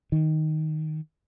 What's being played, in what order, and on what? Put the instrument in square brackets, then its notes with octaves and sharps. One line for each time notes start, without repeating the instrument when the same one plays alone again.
[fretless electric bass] D#3